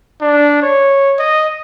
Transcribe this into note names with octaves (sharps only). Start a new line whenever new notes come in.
D4
C#5
D#5